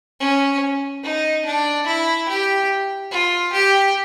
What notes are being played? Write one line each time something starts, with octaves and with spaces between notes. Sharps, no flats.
C#4
D#4
D4
E4
G4
F4
G4